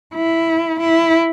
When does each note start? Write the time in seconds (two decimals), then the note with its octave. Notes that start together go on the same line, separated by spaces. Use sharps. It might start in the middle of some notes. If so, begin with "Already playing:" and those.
0.15 E4
0.80 E4